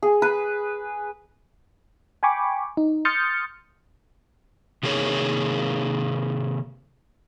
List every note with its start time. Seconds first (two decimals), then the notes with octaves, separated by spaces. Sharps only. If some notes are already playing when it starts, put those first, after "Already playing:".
0.03 G#4
0.22 B4
2.23 G5 G#5 B5 C#6 D6
2.77 D#4
3.05 C6 D#6 F6 G6 A6 C#7
4.83 C3 D#3 A#3 G#4 C#5